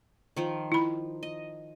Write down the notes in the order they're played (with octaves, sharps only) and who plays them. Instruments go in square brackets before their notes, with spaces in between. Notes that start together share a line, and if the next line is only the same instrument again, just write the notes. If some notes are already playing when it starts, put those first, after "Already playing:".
[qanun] D#3 F3
[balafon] E4 B5
[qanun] D#5